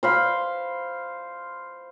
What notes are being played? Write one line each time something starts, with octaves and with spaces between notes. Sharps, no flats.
C5 F5 B5